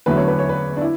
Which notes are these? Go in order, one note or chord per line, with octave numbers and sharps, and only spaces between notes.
E2 D3 F#3 A3 B4
C#5
B4
C#5
B4
D4
E4